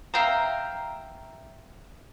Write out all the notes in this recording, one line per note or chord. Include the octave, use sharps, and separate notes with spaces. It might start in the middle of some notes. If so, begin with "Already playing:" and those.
E5 F5 G5 A#5